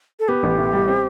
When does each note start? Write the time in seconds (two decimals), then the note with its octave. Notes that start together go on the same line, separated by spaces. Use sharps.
0.20 A4
0.28 B3 G4
0.43 A1
0.58 A2
0.73 G3
0.88 C4